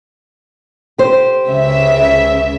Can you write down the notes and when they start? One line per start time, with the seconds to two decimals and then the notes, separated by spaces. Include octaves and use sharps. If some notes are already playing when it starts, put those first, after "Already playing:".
0.98 G4 C5
1.47 C#2 C#3 E5